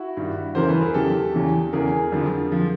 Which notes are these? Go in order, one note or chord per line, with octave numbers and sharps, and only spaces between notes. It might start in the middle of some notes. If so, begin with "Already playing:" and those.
Already playing: E4 F#4
G2 D#3
E2 C#3 E3 A#4 C5
A4 B4
G#4 A#4
E2 C#3 E3 G4 A4
E2 C#3 E3
E2 C#3 E3 G#4 A#4
F2 D3 F3
D3 F3